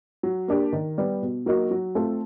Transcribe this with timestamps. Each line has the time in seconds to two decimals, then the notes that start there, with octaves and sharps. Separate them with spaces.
0.23 F#3
0.48 A#3 D4 G4
0.73 D#3
0.98 G3 B3
1.22 B2
1.46 F#3 A#3 D#4 F#4
1.71 F#3
1.95 A3 C4 F4 A4